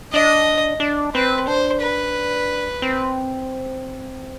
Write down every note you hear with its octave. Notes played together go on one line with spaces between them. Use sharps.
D4 D#5
D4
C4 B4
D4 C5
B4
C4